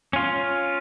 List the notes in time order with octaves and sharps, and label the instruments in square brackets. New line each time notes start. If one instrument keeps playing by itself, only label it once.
[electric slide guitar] C#4 F4